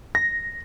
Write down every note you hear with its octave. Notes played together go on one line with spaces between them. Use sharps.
A#6